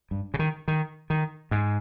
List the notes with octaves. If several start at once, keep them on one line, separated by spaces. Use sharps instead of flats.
G2
C#3
D#3
D#3
D#3
G#2